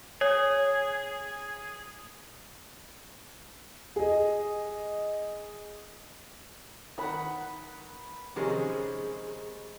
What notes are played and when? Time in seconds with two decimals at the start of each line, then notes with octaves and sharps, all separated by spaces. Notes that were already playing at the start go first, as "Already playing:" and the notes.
0.21 G#4 C#5
3.96 G#4 D#5
6.98 D#3 B4 F#5 B5
8.36 C3 D#3 F3 G#3 C#4 G#5